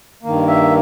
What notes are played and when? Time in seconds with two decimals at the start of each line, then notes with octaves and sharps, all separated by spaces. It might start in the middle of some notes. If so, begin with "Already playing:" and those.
0.23 G2 D#3 A#3
0.48 E5